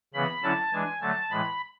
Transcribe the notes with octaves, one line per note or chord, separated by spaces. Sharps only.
C#3 E3 B3 B5
D3 F#3 C#4 E4 A5
E3 G#3 D4 G#5
D3 F#3 A3 A5
A2 E3 G#3 B5